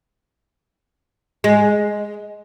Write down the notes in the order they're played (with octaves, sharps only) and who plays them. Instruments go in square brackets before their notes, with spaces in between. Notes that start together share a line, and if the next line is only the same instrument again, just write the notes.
[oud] G#3